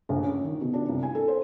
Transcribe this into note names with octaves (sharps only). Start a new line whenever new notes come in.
A#1
C#4
D#3
B2
D4
C2
G#5
A4
C5